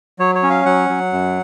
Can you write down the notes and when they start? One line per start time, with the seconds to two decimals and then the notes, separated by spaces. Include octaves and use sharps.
0.19 F#3 C#5
0.35 C#5
0.43 C#4
0.50 F5
0.66 F#3 F#5
0.89 F#3
1.13 F#2